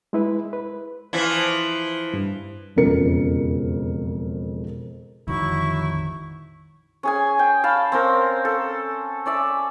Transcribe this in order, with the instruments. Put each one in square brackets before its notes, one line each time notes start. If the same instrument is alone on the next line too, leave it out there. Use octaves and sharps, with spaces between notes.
[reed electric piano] G#3 E4 B4
B4
[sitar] E3 F3 E4
[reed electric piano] G2
[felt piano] E1 F2 C#3 F4 A#4 C#7
[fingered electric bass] A#1 F2 [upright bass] D#3 [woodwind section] F#3 D#4 E4 [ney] C#6
[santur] C#4 G#4 G#5
G5
F5 A5 B5
C4 C#4 A#4
A4
C#4 D5 E5